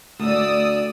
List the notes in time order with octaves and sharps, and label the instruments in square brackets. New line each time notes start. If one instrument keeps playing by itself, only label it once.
[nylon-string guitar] D2 [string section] D5 D#6 E6